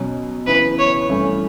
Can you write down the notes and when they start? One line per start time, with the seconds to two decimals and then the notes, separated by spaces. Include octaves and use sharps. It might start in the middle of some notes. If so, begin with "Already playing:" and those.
Already playing: B2 F#3 C#4
0.47 C#3 E3 B3 B4
0.79 C#5
1.09 G2 E3 A3 C#4